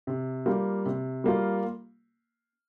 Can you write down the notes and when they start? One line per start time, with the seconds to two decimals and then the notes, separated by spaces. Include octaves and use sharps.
0.07 C3
0.46 G3 A#3 F4
0.86 C3
1.24 G3 A#3 F4